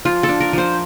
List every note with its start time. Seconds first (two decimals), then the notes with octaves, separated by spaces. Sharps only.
0.05 F3 F4
0.23 A4
0.29 D4
0.40 A#4
0.53 F3 C5